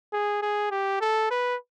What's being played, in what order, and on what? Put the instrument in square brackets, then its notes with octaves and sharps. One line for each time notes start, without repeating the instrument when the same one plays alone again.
[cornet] G#4
G#4
G4
A4
B4